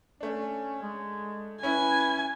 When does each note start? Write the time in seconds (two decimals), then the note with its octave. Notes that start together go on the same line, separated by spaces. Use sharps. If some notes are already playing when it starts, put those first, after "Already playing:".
0.21 A3 C#4 D4
0.82 G#3
1.63 C#4 E4 B4 G#5